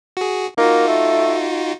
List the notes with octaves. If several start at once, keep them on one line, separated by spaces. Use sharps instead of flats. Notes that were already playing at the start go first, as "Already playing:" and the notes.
F#4 G#4
A#3 D#4 F4 F#4
A3